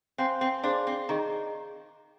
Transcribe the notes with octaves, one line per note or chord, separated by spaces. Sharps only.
C4 C5 F5 G#5 C6
C4
D4 G#4 C5 F5 C6
C4
D#3 G#4 D#5 A#5